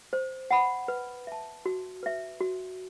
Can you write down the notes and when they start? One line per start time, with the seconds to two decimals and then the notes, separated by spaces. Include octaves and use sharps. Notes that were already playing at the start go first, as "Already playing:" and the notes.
0.13 C5
0.51 F#5 B5
0.88 B4
1.27 E5 A5
1.66 F#4
2.03 B4 E5
2.41 F#4